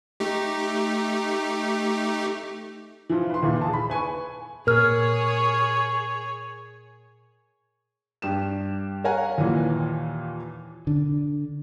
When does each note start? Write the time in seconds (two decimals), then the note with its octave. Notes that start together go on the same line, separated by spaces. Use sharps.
0.20 A3 D#4 G4
3.10 E3 F3
3.30 B4 C6
3.43 D#2 A#2 E3
3.61 G#4 A5
3.73 B5
3.90 B4 G#5 C#6
4.67 A#2 G#4 A#4 C#5 F6
8.22 G2 G4 E7
9.04 A#4 C#5 F5 F#5 G#5 A#5
9.38 D#2 A#2 E3
10.87 D3